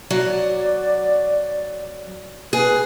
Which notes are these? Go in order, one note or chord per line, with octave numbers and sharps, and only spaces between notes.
F#3 D5
G#4 B4